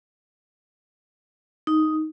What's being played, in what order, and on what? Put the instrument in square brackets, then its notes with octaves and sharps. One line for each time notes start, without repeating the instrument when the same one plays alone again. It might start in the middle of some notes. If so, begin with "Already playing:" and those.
[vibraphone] D#4